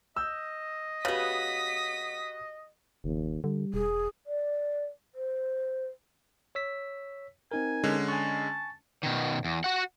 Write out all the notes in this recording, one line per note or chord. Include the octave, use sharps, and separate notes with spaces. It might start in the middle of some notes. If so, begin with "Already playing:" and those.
D#5 E6 G6
C#3 B3 F#4 G4 B4 D#6 B6
F#1 D#2
D3 G3
E1 G#4
D5
C5
C#5 E6 B6
C4 D#4 A#4 G#5
D3 G#3 C#4
G#5 A5 C#6
B2 D#3
E2
F#4 F#5